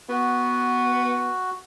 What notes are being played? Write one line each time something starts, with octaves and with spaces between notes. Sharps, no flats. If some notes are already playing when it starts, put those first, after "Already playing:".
B3 F#4